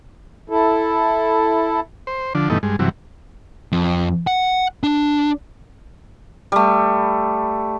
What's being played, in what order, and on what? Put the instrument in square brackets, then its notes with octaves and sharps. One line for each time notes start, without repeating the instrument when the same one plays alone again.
[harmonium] E4 A4
[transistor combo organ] C5
D3 F3 D4
G2 B2 E3 A3 D#4
G2 G#3
G2 C3 E3 F#3
[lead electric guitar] F2
F#5
D4
[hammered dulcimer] G3 A3